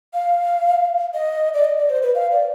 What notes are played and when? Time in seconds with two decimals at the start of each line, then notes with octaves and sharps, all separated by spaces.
0.14 F5
1.14 D#5
1.54 D5
1.64 D#5
1.77 D5
1.89 C5
2.02 B4
2.15 F5
2.31 D5